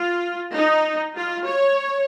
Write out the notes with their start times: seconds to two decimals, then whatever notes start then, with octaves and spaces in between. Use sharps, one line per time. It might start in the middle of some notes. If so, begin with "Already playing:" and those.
Already playing: F4
0.55 D#4
1.16 F4
1.47 C#5